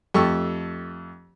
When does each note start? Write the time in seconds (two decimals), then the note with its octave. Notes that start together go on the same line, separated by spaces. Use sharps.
0.14 F2 A3 G4 A4 C#6 E6